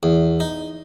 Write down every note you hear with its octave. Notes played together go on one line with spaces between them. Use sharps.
E2
D#4